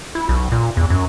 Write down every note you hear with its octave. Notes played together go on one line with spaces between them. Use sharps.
E4
B1
A#2
E2
F#2